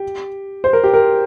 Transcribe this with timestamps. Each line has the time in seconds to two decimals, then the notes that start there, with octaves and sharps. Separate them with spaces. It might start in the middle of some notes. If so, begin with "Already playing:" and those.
Already playing: G4
0.64 C5
0.73 A#4
0.84 G4
0.94 A#4